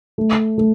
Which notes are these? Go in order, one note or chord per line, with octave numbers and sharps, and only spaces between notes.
A3
A3